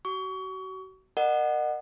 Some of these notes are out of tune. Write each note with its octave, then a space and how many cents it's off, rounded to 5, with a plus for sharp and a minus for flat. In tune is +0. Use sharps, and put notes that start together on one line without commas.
F#4 +35 C#6 +30
A#4 +0 D#5 -40 F#5 +0